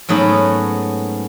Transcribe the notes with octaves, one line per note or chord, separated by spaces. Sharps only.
G#2 F#3 A3 B3 C#4